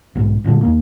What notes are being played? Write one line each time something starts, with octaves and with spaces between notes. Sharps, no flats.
B1 G#2
F#1 A#2 D3 G#3
D#2 A#3